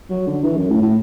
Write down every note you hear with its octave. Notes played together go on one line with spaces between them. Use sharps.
F#3
D3
E3
F#2
A2
A2